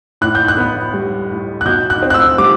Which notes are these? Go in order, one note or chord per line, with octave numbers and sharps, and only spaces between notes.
A2 F#6
G6
F#6
B3
G3
A2
F#6
B2 G6
F#6
C4
F#6
E6
G3 D6